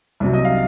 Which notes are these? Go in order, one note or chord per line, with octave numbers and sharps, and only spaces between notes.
C2 C3 F#3
D#5
F5